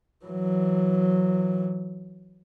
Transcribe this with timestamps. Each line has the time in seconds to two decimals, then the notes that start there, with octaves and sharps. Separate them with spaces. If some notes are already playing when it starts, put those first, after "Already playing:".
0.25 E3 F#3